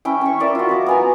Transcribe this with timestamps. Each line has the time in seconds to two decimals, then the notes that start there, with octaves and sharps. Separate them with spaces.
0.05 C#4 E4 G5
0.21 C#4 C#6
0.40 E4 A#4 D5 E5
0.55 F4 F#4
0.69 D#5 D6
0.86 B3 G#5 A#5